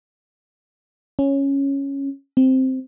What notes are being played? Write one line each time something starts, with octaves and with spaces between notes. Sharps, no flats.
C#4
C4